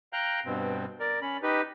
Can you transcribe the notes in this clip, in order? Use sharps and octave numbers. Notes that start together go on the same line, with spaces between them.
F5 G5 A#5 F#6 G6
G2 B2 C4
A#4 D5
C#4 B5
D#4 G4 B4